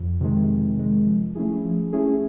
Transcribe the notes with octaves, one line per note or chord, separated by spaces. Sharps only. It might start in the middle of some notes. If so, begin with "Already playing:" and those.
Already playing: F2
C3 D#3 G#3
F2
C3 D#3 G#3
F3
A3 C#4 E4 G#4
F3
A3 C#4 E4 G#4